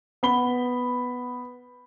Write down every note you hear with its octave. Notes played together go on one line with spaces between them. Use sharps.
B3 B5 G7